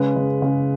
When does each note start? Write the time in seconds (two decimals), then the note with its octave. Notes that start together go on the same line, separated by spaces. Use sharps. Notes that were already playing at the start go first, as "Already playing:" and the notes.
Already playing: C#3 G#3 B4
0.16 C#3
0.42 C#3